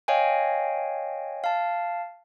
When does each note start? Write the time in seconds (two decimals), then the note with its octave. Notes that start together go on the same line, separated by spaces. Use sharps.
0.08 C#5 D#5 F5 G5 G#5
1.44 F5 A5